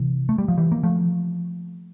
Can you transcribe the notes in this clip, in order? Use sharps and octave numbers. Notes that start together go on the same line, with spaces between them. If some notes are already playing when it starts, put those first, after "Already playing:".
Already playing: C3 E3
A3
G3
F3
E3 G3
A#3
F3 A3